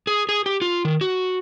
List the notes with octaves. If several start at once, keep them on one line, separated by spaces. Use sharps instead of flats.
G#4
G#4
G4
F4
D#3
F#4